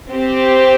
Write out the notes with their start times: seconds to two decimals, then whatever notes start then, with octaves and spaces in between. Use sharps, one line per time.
0.11 C4 G4